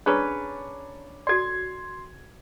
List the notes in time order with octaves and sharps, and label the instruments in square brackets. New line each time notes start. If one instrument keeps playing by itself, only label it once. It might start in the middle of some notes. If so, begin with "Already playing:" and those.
[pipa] C#4 B4 [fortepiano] D4 C#5 A#5 [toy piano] G#4 A4
[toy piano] F#4 A4 D5 [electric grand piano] C6 G#6